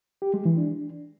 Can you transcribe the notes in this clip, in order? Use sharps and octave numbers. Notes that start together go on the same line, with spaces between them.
G4
G#3
E3
D4